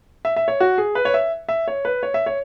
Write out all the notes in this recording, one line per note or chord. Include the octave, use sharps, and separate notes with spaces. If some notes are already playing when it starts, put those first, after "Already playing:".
E5
E5
C#5
F#4
G#4
B4
C#5
E5
E5
C#5
B4
C#5
E5
C#5